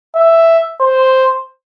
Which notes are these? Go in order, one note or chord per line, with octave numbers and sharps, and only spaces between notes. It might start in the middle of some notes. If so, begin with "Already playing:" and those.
E5
C5